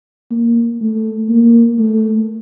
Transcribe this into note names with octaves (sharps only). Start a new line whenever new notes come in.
A#3
A3
A#3
A3